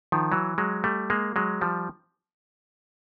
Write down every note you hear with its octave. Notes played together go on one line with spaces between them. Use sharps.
D#3 F3
E3 F#3
F#3 G#3
G3 A3
G#3 A#3
F#3 G#3
F3 G3